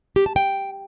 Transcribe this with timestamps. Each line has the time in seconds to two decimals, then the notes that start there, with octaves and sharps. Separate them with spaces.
0.16 G4
0.26 A5
0.36 G5